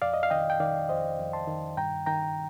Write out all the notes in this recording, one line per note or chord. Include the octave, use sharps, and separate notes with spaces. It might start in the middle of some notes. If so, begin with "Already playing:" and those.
F2 D5 F5
D#5
F5
D#3 D#5 G5
G5
D#3 D5 F5
F2 C5 D#5
F2
A5 C6
D#3
G2 G5 A#5
D#3 G5 A#5